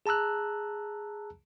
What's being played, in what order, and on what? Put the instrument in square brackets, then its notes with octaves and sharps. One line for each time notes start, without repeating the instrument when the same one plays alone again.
[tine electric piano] G#4 A5 A#5 E6 F#6